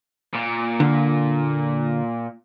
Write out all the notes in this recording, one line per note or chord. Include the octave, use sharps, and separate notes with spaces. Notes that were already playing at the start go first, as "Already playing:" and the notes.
A#2
D3